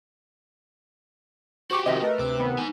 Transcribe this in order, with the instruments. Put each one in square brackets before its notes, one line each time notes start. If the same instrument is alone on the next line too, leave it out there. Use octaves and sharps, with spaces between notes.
[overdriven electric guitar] F#4 G4 [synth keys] C5 D6 [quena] C#6
[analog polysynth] C3 D#3 F3 [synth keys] D#5 [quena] E5
[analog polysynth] A3 A#4 [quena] B4
[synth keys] D2 E6 [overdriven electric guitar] C3 [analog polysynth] D6
[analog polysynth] D#3 B3
[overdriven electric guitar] D#4 G#5